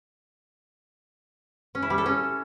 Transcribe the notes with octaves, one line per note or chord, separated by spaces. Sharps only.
C#4
E4
G3
A4
C#4